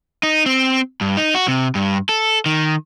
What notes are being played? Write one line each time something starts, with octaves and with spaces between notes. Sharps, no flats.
D#4
C4
G2
D#4
F#4
C3
G2
A4
D#3